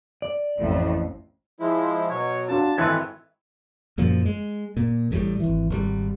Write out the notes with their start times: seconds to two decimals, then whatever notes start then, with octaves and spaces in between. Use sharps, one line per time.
0.22 D5
0.59 A1 F2 A2
1.59 F3 G#3 E4
2.10 B2 F#3 C#5
2.48 D4 F4 F#4 A5
2.78 G#1 E3 A4 B4 G#5 G#6
3.98 F#2 A#2 F3
4.25 G#3
4.77 A#2
5.11 A1 A2 D#3 G3
5.40 G#1 E3
5.70 G#1 C#3 G3